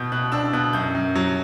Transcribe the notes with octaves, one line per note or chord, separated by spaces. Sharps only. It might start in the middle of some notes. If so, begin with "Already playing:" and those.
Already playing: B2 G6
B2 F#6
D4 E6
B2 F#6
F#2 G6
F#2
F#3